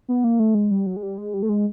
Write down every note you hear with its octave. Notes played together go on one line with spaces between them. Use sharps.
B3
A#3
A3
G#3
G3
F#3
G#3
G3
G#3
G3
A3
G#3